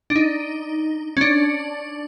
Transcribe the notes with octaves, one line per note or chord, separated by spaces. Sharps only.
D4
D#4
C#4
D4